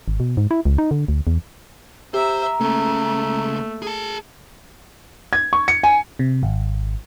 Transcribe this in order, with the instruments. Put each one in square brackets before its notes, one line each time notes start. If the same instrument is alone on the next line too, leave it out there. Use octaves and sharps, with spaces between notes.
[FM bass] G#1
B2
G#2
E4
C#2
D#4
D3
D2
E2
[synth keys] G4 [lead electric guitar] C5 [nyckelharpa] E5 [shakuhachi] A#5
[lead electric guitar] C#2 C#4 [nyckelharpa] A3 [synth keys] A#3
[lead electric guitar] G#4 A5
[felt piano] G#6
C#6
C#7
G#5
[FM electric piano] C3
G#1